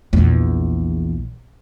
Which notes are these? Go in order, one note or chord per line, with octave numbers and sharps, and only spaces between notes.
A#1 E2